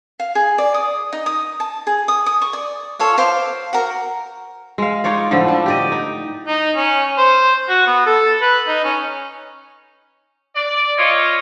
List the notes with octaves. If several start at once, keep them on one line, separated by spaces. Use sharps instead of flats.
F5
G#4
D5
D#6
D#4
D#6
A5
G#4
D#6
D#6
C#6
D5
F4 A4 C#5 F5
C5 F5 D6
F#4 A#4
G#3 F5
D#4 F4 C#5 D5
A2 D3 F3
D4
G4 D5 D#5
D#4
D#4
C#4
C5
F#4
B3
A4
B4
D#4
C#4
D5
F4 C#5 D#5